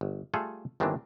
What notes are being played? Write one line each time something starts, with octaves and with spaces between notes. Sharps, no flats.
G1
G3 A3 F4 G#4 A4
G1 D#3 E3 A#3 C4 D4